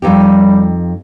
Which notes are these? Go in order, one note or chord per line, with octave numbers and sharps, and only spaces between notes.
F2 G3 D#4 G4